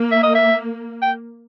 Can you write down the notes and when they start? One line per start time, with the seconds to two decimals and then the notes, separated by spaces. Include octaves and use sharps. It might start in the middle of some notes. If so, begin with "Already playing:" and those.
Already playing: A#3
0.12 E5
0.23 D#5
0.35 E5
1.02 G5